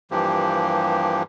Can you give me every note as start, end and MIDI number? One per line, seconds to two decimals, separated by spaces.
0.11 1.23 43
0.11 1.23 52
0.11 1.23 53
0.11 1.23 58
0.11 1.23 67